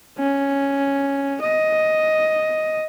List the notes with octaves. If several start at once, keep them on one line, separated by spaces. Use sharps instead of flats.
C#4
D#5